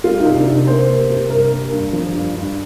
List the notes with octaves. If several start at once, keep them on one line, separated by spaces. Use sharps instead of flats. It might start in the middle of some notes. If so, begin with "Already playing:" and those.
G3 F4
D#4
C3
D4
C3
D#4
A#3 C5
A#3
C3
G2 A#4
A#3
G2
F3
G2
G2